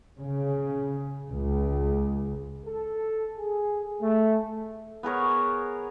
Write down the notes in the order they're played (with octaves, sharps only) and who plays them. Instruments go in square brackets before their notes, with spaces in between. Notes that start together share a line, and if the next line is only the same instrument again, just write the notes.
[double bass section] C#3
C#2
[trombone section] A4
G#4
A3
[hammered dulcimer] B3 G#4 A#4 C#5